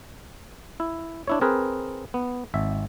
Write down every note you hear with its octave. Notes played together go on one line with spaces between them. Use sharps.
E4
D4 E4 C#5
C4 G#4 A#4 B4
B3
G#1 E5